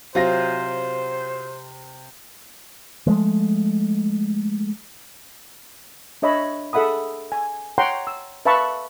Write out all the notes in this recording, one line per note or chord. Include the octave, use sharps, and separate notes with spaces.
C3 F#3 F4 C5 A#6
F3 G#3 A3
D4 C#5 D#5 E5 B5
G#4 A4 E5 F#5 B5 D#6
G#5
C#5 F#5 G5 A#5 C6
E6
B4 E5 F5 A5 B5 C#6